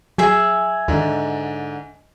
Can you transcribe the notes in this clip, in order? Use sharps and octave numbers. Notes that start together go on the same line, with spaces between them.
F#3 G#4 E5 G#5
D#2 G#2 D3